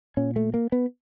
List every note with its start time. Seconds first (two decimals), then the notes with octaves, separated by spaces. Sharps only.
0.17 A#2 C#4
0.36 A3
0.54 A#3
0.72 B3